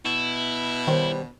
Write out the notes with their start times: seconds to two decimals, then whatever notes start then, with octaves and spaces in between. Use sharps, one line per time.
0.05 B2 E4
0.87 D#3 G3 C#4 C5